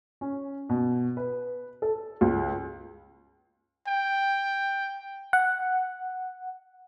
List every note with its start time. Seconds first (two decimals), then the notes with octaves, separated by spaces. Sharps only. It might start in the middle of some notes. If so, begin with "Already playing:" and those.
0.21 C#4
0.69 B2
1.17 B4
1.82 A4
2.21 C#2
3.87 G5
5.33 F#5